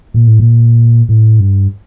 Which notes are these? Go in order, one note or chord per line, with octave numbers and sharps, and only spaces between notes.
A#2
A2
A#2
A2
G2